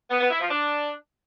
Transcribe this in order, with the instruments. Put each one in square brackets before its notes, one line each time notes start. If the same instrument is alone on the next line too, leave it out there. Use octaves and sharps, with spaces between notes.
[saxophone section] B3
B3
E4
F3
D4